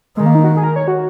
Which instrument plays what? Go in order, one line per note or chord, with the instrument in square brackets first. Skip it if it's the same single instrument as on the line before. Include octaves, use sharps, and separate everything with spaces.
[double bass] D#3 [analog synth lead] G#3
[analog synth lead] A#3
D#4
F#4
G#4
A#4
C#5
F#4